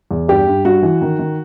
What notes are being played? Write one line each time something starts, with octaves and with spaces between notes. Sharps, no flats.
E2
G2 G4
G2
G2 F#4
E3
D#3
D#3